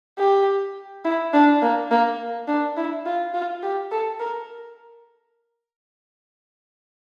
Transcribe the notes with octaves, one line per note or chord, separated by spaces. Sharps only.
G4
E4
D4
A#3
A#3
D4
E4
F4
F4
G4
A4
A#4